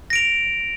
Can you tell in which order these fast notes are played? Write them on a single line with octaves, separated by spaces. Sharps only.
A#6 D7 F7